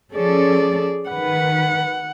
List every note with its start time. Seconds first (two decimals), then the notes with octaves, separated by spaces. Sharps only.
0.13 F3 C#4 G#4 A4 D5
1.10 D#3 B4 F#5